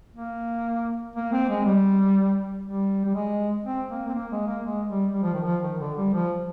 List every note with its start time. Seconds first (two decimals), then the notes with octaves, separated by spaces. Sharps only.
0.16 A#3
1.16 A#3
1.33 C4
1.49 G#3
1.65 G3
2.65 G3
3.05 G3
3.15 G#3
3.65 C4
3.89 A#3
4.08 C4
4.14 A#3
4.31 G#3
4.47 A#3
4.64 G#3
4.89 G3
5.14 G3
5.23 F3
5.34 D#3
5.43 F3
5.63 D#3
5.80 D3
5.97 G3
6.13 F3